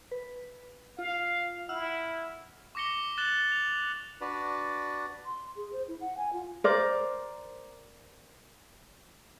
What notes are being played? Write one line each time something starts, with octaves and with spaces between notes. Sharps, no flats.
B4
F4 F5
E4 F#5 E6 F6
C#6 D6 A#6 C#7 G7
F#6 A6 E7 F#7 G7
F7
D4 F#4 B4 D5
C6
G#4
C5
E4
F#5
G#5
F4
A#4 C5 D5